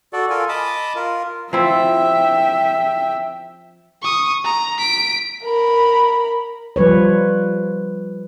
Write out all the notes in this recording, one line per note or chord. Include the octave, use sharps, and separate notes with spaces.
F#4 A4 D5
F4 A4 A#4 G#5
D#5 A5 B5 D6 D#6
F4 A#4
F3 C4 E4 E5 G5
C#6 D#6
A#5
B6 D7
A#4 B5
F3 G3 B4 C#5